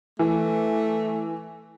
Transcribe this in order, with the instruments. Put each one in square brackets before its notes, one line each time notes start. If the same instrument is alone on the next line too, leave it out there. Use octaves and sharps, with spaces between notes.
[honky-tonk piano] E3 [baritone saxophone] A3